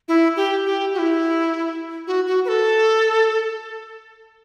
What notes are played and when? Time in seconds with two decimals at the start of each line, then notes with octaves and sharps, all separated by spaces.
0.08 E4
0.36 G4
0.66 G4
0.94 F#4
0.99 E4
2.07 F#4
2.27 F#4
2.45 B4
2.48 A4